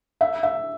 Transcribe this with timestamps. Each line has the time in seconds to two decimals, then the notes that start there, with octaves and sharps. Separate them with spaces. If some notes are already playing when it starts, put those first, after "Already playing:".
0.21 E5
0.43 E5